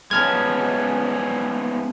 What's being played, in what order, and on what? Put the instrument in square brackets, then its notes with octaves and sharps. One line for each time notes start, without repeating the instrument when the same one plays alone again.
[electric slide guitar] G#3 B3 C#4 [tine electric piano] A5 F6 G#6